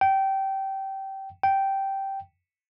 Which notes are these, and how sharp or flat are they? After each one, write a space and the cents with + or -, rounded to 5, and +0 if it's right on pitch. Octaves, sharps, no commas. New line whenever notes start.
G5 -20
G5 -10